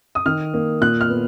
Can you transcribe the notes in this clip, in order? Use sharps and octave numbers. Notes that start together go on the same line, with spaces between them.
D#6
D#3 F6
A#3
A#2 F#6
F6
B3